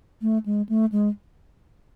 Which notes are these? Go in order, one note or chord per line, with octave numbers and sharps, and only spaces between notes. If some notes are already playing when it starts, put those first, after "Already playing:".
A3
G#3
A3
G#3